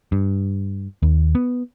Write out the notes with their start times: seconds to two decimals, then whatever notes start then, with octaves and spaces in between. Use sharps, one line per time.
0.12 G2
1.03 D#2
1.35 B3